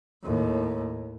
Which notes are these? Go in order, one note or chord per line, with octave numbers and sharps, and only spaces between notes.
D#2 A2